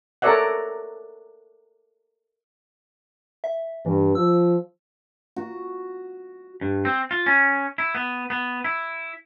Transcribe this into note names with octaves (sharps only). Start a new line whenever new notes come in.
A4 A#4 C#5 D5 E5 F#5
E5
G2 E3
F3 E6
F#4
G2
C4
F4
C#4
E4
B3
B3
E4